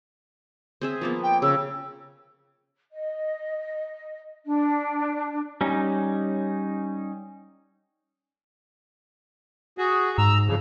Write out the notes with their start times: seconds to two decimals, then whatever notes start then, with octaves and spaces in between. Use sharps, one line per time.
0.81 C4 G#4 E5
1.01 F3 A#3 B3
1.23 G5
1.42 C#3 E6
2.92 D#5
4.46 D4
5.61 G3 C#4 D#4
9.78 F#4 G#4
10.18 G#2 A#5 E6
10.47 F2 C#3